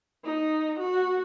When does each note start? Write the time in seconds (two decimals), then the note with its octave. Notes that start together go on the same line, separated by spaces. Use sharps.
0.24 D#4
0.79 F#4